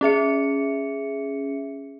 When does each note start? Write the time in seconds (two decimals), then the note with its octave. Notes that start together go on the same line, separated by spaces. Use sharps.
0.01 C#4 G#4 E5 C#7